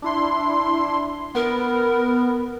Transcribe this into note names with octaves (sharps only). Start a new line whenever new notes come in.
D4 E4 C6
B3 A#4